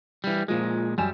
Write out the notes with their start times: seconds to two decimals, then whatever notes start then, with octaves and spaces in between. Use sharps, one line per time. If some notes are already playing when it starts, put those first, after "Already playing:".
0.24 E3 G3
0.48 A#2 F3 G#3
0.98 F#2 G3 G#5 E7